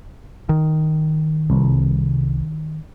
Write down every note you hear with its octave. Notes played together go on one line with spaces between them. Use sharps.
D#3
C2